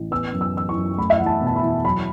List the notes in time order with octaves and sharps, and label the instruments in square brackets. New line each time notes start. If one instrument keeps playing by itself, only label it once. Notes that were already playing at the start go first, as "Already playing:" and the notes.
Already playing: [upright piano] A1
B3 E6
F#2
E6
E3 E6
C#6
F#2
A3 B5
E5
E2 F#5
A5
B2
A5
B5
E2
F#3 B5